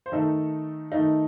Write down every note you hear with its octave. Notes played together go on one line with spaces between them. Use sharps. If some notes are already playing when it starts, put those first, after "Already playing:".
C5
D#3 A3 D#4 A4
D#3 A3 D#4